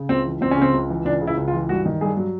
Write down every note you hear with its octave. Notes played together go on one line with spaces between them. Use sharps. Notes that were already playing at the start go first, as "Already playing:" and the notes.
Already playing: C#3
C#2 C4
E3
C#2 C4
C#4
C#3 C4
C#2
E3
C#2 D4
C#3
E4
C#2
F4
E3
G2 F#4
D#3
G2 G#4
F#3